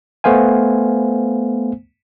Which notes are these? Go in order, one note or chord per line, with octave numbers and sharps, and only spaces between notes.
A3 B3 C5 F5 G#5